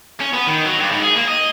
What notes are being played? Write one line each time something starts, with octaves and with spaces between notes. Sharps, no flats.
C#4
B3
D#3
F#3
G2
G#2
G#4
A#3
D#5